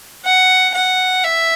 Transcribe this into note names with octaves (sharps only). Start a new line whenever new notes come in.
F#5
F#5
E5